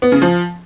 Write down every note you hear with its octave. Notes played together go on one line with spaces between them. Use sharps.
B3
C#3
F3